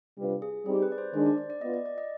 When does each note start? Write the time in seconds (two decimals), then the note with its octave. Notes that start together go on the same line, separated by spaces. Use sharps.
0.18 C3 G3 D4 F4 B4
0.42 G#4
0.66 G3 C4 D#4 G4 G#4
0.82 B4
0.92 D5
0.98 C5
1.14 D#3 G#3 D4 C5
1.26 D5
1.38 D5
1.50 D5
1.61 B3 F4 B4 D#5
1.74 D5
1.86 D5
1.98 D#5